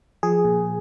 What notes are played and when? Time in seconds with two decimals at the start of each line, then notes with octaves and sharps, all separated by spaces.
0.23 F3 G#4
0.45 A#2